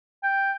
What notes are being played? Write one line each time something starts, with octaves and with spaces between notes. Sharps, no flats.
G5